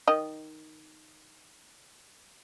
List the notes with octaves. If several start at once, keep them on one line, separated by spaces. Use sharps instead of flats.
D#3 D#5